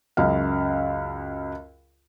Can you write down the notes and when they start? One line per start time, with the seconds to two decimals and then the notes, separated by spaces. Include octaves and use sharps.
0.17 C#2 F#2 F5